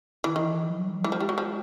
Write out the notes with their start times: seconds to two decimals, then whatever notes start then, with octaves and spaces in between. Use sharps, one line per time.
0.24 D#3 E3
0.36 D#3 E3
0.70 F3
0.78 F#3
0.87 G3
0.95 F#3
1.04 E3 G#3
1.12 F3
1.20 G3
1.29 F#3
1.38 F3